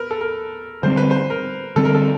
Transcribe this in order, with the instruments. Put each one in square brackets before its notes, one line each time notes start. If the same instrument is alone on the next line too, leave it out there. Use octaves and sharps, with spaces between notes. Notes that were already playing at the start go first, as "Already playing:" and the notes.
Already playing: [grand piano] A#4 B4
A4
A#4
[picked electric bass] D3 G3 C4 [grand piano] C5
[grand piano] B4
C5
A#4
[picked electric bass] D3 G3 C4 [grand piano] A4
[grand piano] A#4
A4